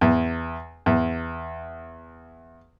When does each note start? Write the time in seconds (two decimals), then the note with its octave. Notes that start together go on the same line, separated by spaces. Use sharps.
0.01 E2
0.86 E2